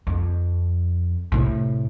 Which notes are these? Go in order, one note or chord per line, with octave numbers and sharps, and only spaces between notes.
F2
A2 C3